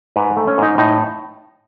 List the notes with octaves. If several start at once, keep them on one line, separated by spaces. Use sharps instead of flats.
G#2 B4
A3
C#4
G#2 D#4
A2 D#4